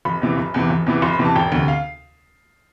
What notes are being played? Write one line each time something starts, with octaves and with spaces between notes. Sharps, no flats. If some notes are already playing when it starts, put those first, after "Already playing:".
F1 B5
E2 C3 E3
F1
E2 C3 E3
F1
E2 C3 E3
F1 C6
B5
E2 C3 E3
A5
E1 G5
D2 C3
F5